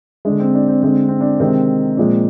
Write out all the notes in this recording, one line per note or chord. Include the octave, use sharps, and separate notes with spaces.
D3 G#3 D4
C4
D4
C4
D3 G#3 C4
C4
D4
C3 D#3 G#3 C4
A#2 F3 G#3